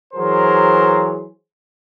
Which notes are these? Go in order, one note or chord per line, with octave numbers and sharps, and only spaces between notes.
E3 F#3 G#4 A#4 C5